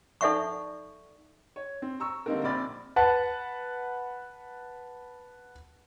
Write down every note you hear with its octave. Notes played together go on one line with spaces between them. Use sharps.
D#4 A4 D5 E5 F#5 C#6
C#5
C4
A#5 C#6 E6
D3 G3 A#3 C4 D#4 A#4
A#1 C4 D5 B5 F6 A6
B4 F#5 A5